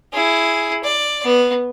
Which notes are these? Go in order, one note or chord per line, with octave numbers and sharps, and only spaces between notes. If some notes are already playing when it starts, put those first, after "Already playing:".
E4 G#4
D5
B3